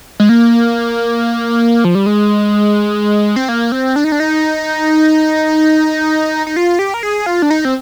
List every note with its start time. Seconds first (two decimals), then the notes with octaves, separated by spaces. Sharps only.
0.20 G#3
0.29 A#3
1.84 F3
1.95 G3
2.06 G#3
3.36 C4
3.49 A#3
3.72 C4
3.96 D4
4.04 D#4
4.12 D4
4.20 D#4
6.47 D#4
6.56 F4
6.79 G4
6.94 A#4
7.03 G#4
7.26 F4
7.42 D4
7.50 D#4
7.65 C4